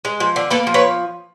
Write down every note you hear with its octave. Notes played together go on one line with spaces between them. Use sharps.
G#3
F3
D3
A#3 A4 B4
F3
B4 C#5